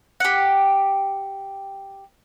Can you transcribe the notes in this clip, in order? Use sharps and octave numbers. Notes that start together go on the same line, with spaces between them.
G4 F#5